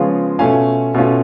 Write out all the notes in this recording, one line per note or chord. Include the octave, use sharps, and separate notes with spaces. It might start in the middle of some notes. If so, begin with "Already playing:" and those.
Already playing: C#3 F3 G#3 B3 F4 C#5
B2 A3 C#4 F4 F5 G#5
B2 A3 C#4 F4